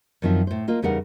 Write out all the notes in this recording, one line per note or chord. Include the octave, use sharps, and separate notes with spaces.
F#2 D#3 F3 C4 E5
A2 C5
A#3 F4 D#5
E2 C#3 G3 D#4 A#4 F#5